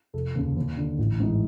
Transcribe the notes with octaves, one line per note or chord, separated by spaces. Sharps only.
F1 A4
D#2 C#3
D#2
D3
A1
G#2 E3